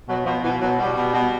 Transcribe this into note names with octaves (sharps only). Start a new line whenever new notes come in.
B2 F#3
B2 F3
B2 E3
B2 F#3
B2 G3
B2
B2